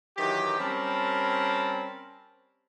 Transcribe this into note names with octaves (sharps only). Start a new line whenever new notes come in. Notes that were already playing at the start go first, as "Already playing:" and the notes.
D#3 E3 F#3 G4
G3 C4 C#4 A#4 A5 B5